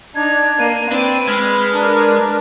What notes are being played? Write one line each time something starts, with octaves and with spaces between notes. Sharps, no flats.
D4 D#4 G#6
A#3 D#7
C4 D4 B4 D5
G#3 B5 F6
D4 A#4